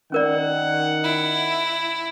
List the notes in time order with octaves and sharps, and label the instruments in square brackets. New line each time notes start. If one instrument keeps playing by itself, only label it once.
[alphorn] D#3 [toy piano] C#4 A#4 D5 [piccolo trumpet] F#5
[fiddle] E4